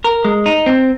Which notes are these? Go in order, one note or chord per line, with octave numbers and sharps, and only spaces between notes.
A#4
G#3
D#4
C4